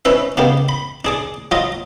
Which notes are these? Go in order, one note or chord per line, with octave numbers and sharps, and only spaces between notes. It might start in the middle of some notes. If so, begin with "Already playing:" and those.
C#4 D#4 B4 E5
C#3 A#3 B3 D#4 G4
B5
D4 G#4 D6
F#3 F4 D#5